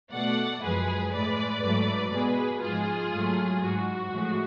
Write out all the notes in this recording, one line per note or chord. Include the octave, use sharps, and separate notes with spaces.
B2 A3 D5 F#5
F#2 F3 G#3 G#4 B4
A2 G#3 B4 D5
G#2 F#3 A3
B2 G#3 G#4 B4
G#2 F3 G#3 F4 G#4
G#2 F#3 A3
G#2 G#3 F#4
A2 F3 G#3